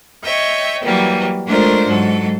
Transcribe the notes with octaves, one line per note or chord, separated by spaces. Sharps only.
C#5 D#5 E5 G5
E3 F#3 G3 A#3
G#3 A3 D4 F4 A#4 C5
G#2 F#3 A4